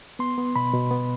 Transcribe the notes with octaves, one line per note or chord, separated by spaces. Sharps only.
B3 C6
B3
B2 B5
B2
B3